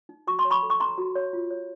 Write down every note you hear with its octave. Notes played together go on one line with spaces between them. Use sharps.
D#4
F#4 C#6
C6
C#5
B5 C#6
A4
C#6
D#4 A#5 C6
F#4
C#5
F4
C#5